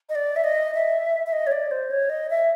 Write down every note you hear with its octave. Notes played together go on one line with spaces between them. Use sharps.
D#5
D5
E5
D#5
E5
E5
D#5
C#5
D5
C5
C#5
D#5
E5